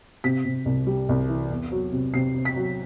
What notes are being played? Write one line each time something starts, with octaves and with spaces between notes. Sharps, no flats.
C3 B6
C3
C2
G3
C2
E3
E2
F#3
C3
C3 C7
C3
B6
F#3